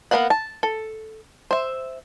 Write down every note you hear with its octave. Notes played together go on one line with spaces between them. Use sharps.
A#3 B3 B4 F5 F#5
A5
A4
C5 E5